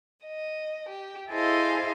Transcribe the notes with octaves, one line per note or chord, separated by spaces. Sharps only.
D#5
G4
E4 G#4 A4 C5 D#5 F5